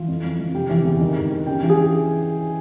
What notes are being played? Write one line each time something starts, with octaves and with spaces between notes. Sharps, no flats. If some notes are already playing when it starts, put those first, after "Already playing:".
Already playing: E3 F4 F5
F2
F2
F2
C3 G4 G5
E3
E2
D#3
G#2
D#3
C#3 G4 G5
E3
G#4 G#5